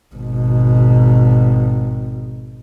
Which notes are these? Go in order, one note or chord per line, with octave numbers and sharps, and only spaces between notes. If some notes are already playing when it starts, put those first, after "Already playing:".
G#1 B2